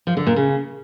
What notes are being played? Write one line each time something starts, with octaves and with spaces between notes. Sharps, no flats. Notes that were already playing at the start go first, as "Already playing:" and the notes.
F3
D3
A#2
C#3